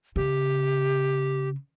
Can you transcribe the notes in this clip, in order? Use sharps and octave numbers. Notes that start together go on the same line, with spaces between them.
C#3 G4